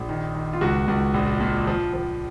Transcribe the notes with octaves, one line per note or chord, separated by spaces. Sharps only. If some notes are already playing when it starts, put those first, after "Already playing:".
Already playing: A#1
D#3
D#3
F4
C#2 F#4
C#2
A#1
A#2
F3
F3